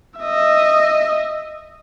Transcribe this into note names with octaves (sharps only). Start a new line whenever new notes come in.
D#5 E5